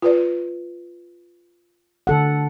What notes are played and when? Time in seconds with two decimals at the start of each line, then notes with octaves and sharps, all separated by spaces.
0.02 F4 B4 D5
2.07 D3 A4 F#5